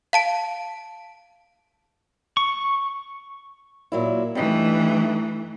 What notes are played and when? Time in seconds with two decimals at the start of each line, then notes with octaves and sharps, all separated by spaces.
0.13 F5 A5 D7
2.37 C#6
3.92 A#2 F#3 E4
4.35 G2 E3 A3 D#4